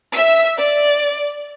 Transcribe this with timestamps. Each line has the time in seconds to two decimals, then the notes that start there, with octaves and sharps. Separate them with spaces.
0.14 E5 E6
0.58 D5